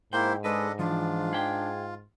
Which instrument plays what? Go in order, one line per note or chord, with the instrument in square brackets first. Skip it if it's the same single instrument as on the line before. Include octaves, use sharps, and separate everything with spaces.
[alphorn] G#2 [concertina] A#3 C5 [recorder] E4 [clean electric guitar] G5
[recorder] G#3 [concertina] D4 A4 D#5 [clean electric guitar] B4
[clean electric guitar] E3 F3 [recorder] D4 [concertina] F4
[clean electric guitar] G#4 G5